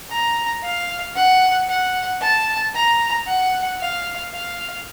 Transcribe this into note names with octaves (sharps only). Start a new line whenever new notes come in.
A#5
F5
F#5
F#5
A5
A#5
F#5
F5
F5